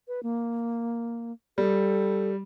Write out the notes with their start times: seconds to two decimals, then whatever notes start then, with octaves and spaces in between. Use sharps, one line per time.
0.08 B4
0.23 A#3
1.58 G3 A4